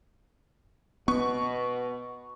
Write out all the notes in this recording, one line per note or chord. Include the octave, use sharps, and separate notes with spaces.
B2 B3 C#6